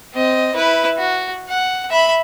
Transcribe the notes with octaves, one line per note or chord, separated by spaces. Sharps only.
C4 D#5
E4 B4
F#4
F#5
E5 B5